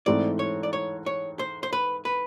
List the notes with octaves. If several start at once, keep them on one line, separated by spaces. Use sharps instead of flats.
G#2 E3 A3 C4 D5
C#5
D5
C#5
C#5
C5
C5
B4
B4